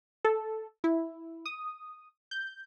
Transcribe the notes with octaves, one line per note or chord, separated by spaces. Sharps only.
A4
E4
D#6
G6